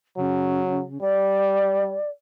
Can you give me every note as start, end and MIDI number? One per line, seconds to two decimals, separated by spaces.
0.17 0.98 49
0.17 0.84 54
1.01 1.97 55
1.01 2.10 74